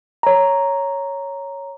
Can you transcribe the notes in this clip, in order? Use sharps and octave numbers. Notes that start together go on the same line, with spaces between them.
C#5 A#5